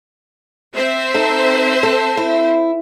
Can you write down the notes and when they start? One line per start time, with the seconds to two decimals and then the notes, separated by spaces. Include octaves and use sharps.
0.74 C4 C5 E5
1.14 D#4 A4
1.83 A4
2.17 E4